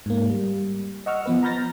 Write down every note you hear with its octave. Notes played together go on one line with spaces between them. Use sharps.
G#2 A#3
G3
D#5 F#5 C#6 E6 F6
F3 B3 B4
A#5 B5 F6 G6 A6 A#6